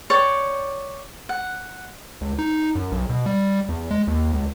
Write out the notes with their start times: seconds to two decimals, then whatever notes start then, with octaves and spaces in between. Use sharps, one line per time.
0.10 C#5 D5 G5
1.29 F#5
2.21 C#2
2.39 D#4
2.75 F#2
2.92 B1
3.09 B2
3.26 G3
3.69 E2
3.91 G#3
4.07 D#2
4.33 C#2